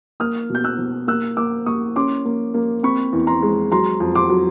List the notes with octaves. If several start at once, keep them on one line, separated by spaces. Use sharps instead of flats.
A#3 D#6 F6
B2 G6
E6 F#6
B2
A#3 E6 F#6
A#3 D6 E6
A#3 C#6 D#6
C#4 C6 D6
A#3
A#3
C4 B5 C#6
E2
A#5 C6
G#3
F#3 A#5 C6
F2
C6 D6
F#3